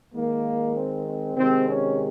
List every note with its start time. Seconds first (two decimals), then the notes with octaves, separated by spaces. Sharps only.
0.14 D#3 G#3 A#3
0.75 C4
1.05 C4
1.35 C3 D#3 G#3 C4
1.67 C#4